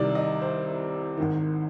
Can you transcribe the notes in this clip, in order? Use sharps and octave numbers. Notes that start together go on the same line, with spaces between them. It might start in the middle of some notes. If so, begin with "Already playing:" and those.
Already playing: C2 C3 D#3 G3 D5
D#5
C5
G#1 G#2 D#3